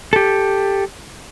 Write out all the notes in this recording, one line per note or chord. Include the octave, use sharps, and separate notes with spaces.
G4 A4